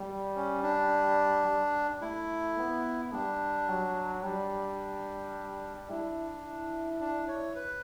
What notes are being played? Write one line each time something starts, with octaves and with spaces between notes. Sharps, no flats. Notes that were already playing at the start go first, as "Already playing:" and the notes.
Already playing: G3
C#4
D4
G3
A3 E4
B3
G3 D4
F#3
G3 D4
D4 E4
E4
D4
C#5
B4